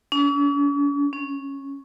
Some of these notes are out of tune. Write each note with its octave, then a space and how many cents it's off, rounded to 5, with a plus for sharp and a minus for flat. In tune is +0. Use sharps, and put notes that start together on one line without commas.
C#4 +45
C#4 -10